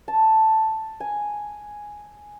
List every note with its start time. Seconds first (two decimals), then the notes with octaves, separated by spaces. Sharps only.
0.08 A5
1.00 G#5